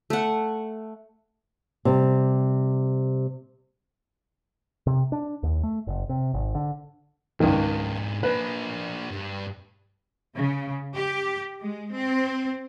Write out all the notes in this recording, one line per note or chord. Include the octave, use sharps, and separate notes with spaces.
A3 F#5
C3 G3
C3
D4
D#2
A3
F#1
C3
G#1
D3
C#2 G#2 D#3 D4
A#3 D4 B4
G2
C#3
G4
G#3
C4